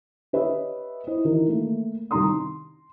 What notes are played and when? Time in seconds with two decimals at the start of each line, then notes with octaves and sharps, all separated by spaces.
0.33 G4 B4 C#5 D#5 E5
1.07 E4 C5 D#5
1.25 D#3 E3 A#4
1.47 A3 A#3
2.11 C2 D#3 D#4 A#5 C6 D#6
2.22 C6